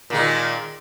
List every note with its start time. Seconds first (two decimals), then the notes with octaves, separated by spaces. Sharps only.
0.10 A#2 D#3 G#3